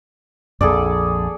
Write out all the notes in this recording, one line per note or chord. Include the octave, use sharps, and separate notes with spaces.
A#1 F2 G#4 A4 D5